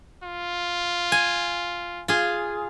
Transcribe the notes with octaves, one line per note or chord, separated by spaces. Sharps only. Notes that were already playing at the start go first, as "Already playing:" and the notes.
F4
G#5
F4 G#4